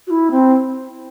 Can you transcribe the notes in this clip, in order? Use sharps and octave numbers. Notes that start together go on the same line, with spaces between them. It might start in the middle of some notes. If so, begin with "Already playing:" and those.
F#4
E4
C4